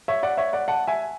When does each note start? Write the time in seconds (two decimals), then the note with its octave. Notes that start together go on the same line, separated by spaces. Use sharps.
0.08 C#5 E5
0.23 D5 F#5
0.37 C#5 E5
0.53 D5 F#5
0.68 F#5 A5
0.87 E5 G#5